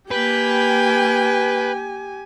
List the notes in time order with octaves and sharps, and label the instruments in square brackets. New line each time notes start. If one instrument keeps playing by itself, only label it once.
[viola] A#3 G5 [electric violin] G4 G#5 [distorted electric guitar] B4